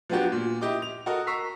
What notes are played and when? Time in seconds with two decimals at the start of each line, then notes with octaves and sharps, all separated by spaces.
0.10 F3 F#3 B3 D4 F#4 G4
0.32 A#2
0.61 E4 G4 D#5 D6
0.82 F7
1.06 F#4 A4 A#4 D#5 F#5
1.27 A#5 C#6 E6 B6 C7